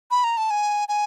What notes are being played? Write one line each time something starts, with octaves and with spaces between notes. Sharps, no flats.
B5
A#5
A5
G#5
G#5